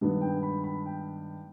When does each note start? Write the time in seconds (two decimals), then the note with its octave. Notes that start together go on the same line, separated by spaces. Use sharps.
0.01 G2 D#3 G#3 B3
0.21 G5
0.43 B5
0.64 B5
0.86 G5